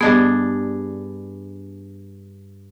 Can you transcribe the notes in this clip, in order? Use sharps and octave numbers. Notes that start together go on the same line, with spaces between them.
G2 B3 D4 G#4 D#5